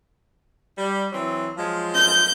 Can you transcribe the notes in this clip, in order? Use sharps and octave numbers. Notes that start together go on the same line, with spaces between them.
G3
E3 F#3 C4
F3 F#3 G#3
G6